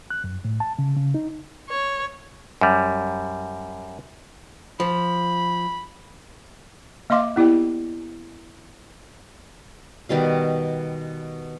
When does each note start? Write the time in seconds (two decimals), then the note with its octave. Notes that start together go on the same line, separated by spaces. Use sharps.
0.10 F#6
0.24 F#2
0.45 A2
0.60 A5
0.79 C#3
0.96 C#3
1.14 D#4
1.70 C#5
2.61 F#2 G3
4.80 F3 B5
7.10 A#3 D#5 F5 C6 D6
7.36 B3 E4 G4 D5 G5
10.09 B2 D#3 G3 F5